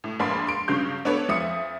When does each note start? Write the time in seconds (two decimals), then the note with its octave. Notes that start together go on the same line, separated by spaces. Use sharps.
0.04 A2
0.20 A#1 A#3 D5 G#5 B5 C6
0.47 C6 D7
0.68 G2 C#3 F#3 F5 C#6 G6
1.05 B3 D4 A4 B4 C#5
1.28 F2 F3 E5 D#6 C#7